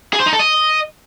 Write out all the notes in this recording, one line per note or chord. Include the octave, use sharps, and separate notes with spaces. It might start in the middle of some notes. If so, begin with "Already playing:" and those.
G#4
C5
D#4
A4
D#5